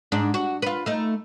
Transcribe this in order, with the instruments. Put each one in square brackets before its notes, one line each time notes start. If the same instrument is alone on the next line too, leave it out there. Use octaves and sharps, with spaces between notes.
[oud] G#2 D4
F#4
F4 B4
A3 D#4